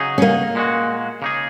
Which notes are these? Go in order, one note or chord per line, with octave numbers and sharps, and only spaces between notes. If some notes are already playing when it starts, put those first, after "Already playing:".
Already playing: C#3 F#3 D#4 G#4
C#4
A#3
A#2 G#3 F#4
C#3 A#3 D#4 G#4